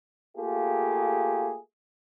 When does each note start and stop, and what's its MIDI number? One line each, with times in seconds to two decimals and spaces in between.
0.37 1.57 57
0.37 1.57 58
0.37 1.57 65
0.37 1.57 67
0.37 1.57 68